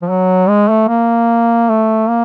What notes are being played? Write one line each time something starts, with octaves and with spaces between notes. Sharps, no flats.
F3
F#3
G#3
A3
A#3
A3
A#3